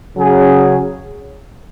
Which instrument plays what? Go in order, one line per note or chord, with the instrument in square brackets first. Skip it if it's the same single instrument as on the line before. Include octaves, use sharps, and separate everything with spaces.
[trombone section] C#3 F#3 C#4 G#4